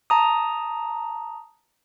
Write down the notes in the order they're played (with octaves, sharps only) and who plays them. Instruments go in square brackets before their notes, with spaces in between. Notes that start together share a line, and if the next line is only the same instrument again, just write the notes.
[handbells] A5 A#5 D#6